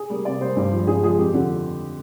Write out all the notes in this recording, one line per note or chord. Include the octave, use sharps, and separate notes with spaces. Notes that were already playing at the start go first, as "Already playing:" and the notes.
Already playing: G#4
G3 A#3
C3 D5
G3 A#3 C5
G2
F3 G#3
G2 G#4
F3 G#3 G#4
F2 G4
D3 F3